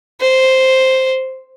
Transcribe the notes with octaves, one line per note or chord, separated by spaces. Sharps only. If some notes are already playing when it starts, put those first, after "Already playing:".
C5